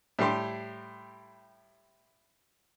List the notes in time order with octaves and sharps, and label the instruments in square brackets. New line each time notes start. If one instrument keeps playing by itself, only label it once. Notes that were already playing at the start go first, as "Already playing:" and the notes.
[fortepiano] A2 G3 G4 C6